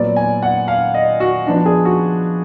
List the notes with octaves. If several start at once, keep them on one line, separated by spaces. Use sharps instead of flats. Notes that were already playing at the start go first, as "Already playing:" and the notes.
Already playing: A#2 F#3 B3 D5
G#5
F#5
F5
D#5
F#4
F3 B3 D4
G#4
F#4